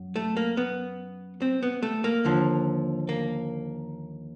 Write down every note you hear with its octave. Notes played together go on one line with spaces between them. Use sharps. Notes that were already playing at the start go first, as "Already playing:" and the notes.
Already playing: F#2
A3
A#3
B3
C4
B3
A3
A#3
D#2 D3 F3
A#3